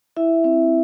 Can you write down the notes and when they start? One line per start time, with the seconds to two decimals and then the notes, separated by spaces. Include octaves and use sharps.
0.17 E4 E5
0.44 C4